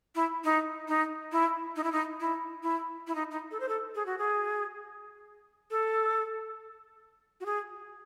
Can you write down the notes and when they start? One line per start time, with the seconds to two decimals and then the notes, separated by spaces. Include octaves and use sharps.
0.15 E4
0.44 D#4
0.88 D#4
1.32 E4
1.76 D#4
1.84 E4
1.92 D#4
2.20 E4
2.63 E4
3.07 E4
3.15 D#4
3.31 D#4
3.51 A4
3.60 C5
3.69 A4
3.95 G#4
4.06 F#4
4.19 G#4
5.71 A4
7.40 F#4
7.46 G#4